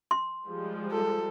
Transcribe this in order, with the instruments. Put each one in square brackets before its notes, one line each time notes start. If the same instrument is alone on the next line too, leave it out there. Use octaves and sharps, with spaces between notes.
[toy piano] C6
[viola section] F3 G3 G#3
[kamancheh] A4